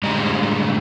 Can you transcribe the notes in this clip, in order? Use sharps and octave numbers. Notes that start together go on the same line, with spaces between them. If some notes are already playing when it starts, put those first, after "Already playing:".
A2 D3 G3 G#3 D#5 A#5